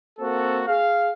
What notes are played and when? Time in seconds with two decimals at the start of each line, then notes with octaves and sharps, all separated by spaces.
0.19 A#3 C4 F#4 A4
0.66 G#4 F5